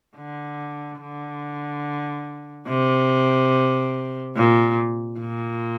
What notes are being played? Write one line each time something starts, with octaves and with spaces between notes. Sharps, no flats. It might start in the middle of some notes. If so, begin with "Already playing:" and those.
D3
D3
C3
A#2
A#2